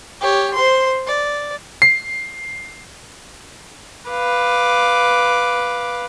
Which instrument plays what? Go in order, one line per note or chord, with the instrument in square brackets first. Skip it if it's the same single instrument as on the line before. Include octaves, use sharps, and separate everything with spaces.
[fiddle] G4 C#5
C5 C6
D5
[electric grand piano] C7
[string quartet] B4 F5 D6